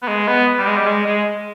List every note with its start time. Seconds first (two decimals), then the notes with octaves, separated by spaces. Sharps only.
0.02 B3
0.08 G#3
0.28 B3
0.58 G3
0.67 G#3
0.77 G3
0.87 G#3
1.06 G#3